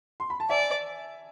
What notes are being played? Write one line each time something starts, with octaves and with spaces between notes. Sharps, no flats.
C6
B5
A5
D5 E5 G#5